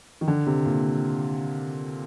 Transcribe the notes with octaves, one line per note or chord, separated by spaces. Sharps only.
D#3
D3
C3
A#2